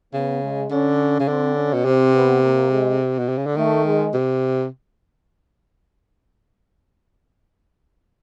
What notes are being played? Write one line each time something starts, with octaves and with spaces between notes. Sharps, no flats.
C#3 B3
G#3
D3 C#4
C#3
D3 C4
C#4
B2
C3 C4
B3
A#3
G#3
B2
C3
C#3
D3
D#3 A3
G#3
C3